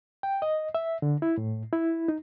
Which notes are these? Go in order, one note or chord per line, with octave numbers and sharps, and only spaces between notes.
G5
D#5
E5
D3
E4
A2
E4
D#4